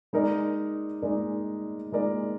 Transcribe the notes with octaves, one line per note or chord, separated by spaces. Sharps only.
G#3 D#4 A#4 D5
G#3 D#4 A#4 D5
G#3 D#4 A#4 D5